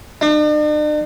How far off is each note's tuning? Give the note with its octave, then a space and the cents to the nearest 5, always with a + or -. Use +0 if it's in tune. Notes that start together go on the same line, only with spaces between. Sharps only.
D4 +45